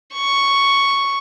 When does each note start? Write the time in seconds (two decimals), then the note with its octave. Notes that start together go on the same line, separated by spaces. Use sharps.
0.14 C#6